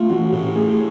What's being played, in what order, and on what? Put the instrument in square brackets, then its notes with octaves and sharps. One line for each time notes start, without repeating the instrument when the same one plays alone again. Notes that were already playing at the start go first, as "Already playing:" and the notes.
Already playing: [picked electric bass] A3 [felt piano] F4
[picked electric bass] E3 [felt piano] F#4
[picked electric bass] A2 [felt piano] G4
[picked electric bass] A3 [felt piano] G#4